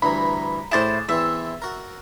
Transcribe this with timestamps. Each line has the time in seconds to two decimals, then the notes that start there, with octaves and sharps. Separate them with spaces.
0.02 D2 G2 E3 A#5 B5
0.71 A2 E4 G#4 C5 D5 A6 E7
1.09 E2 E3 C4 E5 E6 E7
1.62 F#4 A#4